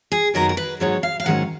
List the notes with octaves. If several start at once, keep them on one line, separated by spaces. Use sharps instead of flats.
G#4
F#2 D#3 F#3 B3 D#4 A#4
A#4
B4
G#2 F#3 B3 D#4 C#5
F5
F5
G#2 D#3 F#3 C#4 F#5